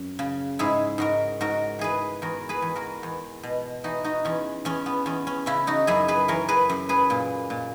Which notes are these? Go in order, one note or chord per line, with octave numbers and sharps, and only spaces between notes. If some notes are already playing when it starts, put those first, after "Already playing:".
Already playing: F#2
C#3
G#2 E4 G#4
G#2 F#4 A#4
G#2 F#4 A#4
E3 G#4 B4
E2 F#4 A#4
G#4 B4
E2
F#4 A#4
E2
B2
E3 D#4 F#4
D#4 F#4
E2 C#4
E2 C#4
B3
E2 C#4
C#4
C#3 C#4 E4
D#4 F#4
F#2 E4 G#4
G#4 B4
E3 A#4 C#5
G#4 B4
F#2
G#4 B4
A#2
A#2